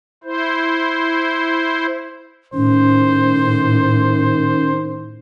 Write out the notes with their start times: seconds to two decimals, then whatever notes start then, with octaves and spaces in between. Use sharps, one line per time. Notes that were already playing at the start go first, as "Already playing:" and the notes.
0.24 E4 C5
2.54 A2 D#3 C#4 C5